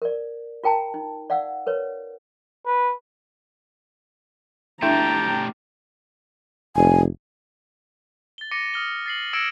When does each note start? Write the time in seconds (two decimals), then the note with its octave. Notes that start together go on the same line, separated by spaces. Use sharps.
0.02 A#4 D5
0.64 F4 A#4 G5 A5 A#5
0.94 D#4
1.30 D5 F5 F#5 E6
1.66 A#4 B4 C#5
2.66 B4
4.82 A3 D4 E4 G4 E5 G5 A5 A#5
6.76 F1 G#5
8.38 A6 G7
8.51 D6 A#6 C#7 D#7
8.74 D#6 F6 G7
9.06 A6 C7 F#7
9.33 E6 G#6 A#6 C#7 D7 E7